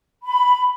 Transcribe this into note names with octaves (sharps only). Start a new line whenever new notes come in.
B5